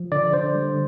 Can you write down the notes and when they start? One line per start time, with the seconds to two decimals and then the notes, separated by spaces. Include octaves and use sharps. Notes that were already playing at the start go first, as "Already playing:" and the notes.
Already playing: F3
0.12 D3 D5
0.33 D3 C5
0.55 G3